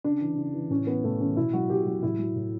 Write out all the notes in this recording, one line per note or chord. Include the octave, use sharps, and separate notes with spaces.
C#3 D4
E3
C#3
E3
A2 C#4
E3 B3
A2 A3
E3 C#4
B2 E4
F#3 F#4
B2 G4
F#3 F#4
A2 E4
F#3
A2